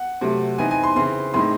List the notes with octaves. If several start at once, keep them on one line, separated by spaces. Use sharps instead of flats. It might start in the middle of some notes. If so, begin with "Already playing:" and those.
Already playing: F#5
C3 F#3 A3
E3 C4 D#4 G#5
G#5
C6
C#3 E3 C4 C6
A2 G#3 C4 D#4 C6